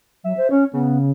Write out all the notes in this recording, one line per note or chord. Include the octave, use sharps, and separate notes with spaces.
F#3 E5
C5
C#4 C#5
C#3 B3